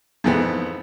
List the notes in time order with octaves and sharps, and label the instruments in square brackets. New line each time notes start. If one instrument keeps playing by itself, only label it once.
[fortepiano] F2 G#2 E3 B3 C4